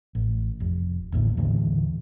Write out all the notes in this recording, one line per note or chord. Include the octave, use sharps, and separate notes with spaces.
A1
F1
A1 D#2 A2 D3
D#2 A2 D3 E3